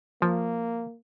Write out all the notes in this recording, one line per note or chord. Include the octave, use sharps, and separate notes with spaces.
F3 A#3